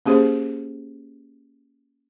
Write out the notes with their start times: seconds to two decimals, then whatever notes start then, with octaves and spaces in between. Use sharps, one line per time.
0.06 A#3 C#4 G4 G#4 C5